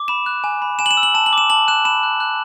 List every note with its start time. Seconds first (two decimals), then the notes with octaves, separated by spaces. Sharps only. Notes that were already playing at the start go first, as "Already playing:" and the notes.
Already playing: D6
0.08 B5 E7
0.26 F#6
0.44 G#5
0.62 B5
0.79 G#5 E7
0.86 F#7
0.91 E7
0.97 E6
1.03 F#7
1.14 A5 E7
1.26 F#7
1.33 D6 E7
1.50 A5 F#7
1.68 F#6 E7
1.85 B5 E7
2.03 F#6
2.20 F#6